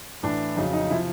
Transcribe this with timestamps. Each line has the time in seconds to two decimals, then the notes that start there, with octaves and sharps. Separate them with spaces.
0.23 A2 E3 D4
0.57 F2 C#3 F#3 D#4
0.73 D#4
0.90 C3 F3 E4